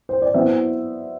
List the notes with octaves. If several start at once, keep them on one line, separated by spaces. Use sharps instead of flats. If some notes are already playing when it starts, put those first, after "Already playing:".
C5
D5
F#3 B3 E4 C5 E5